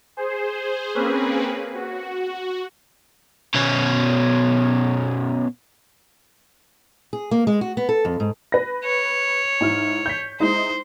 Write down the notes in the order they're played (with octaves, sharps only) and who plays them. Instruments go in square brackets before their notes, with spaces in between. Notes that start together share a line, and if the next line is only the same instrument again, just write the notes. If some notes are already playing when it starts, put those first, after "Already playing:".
[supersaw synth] G#4 C5
A#3 C4 C#4 G#4 B4
F#4
[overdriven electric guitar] B2 C#4
[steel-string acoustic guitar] G#4
A#3
G#3
F#4
B3
A4
F2
G#2
[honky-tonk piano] B4 A#6
[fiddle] C#5
[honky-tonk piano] G#2 E4 F6
G6 B6
[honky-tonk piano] G#3 D#4 E4 [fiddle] C5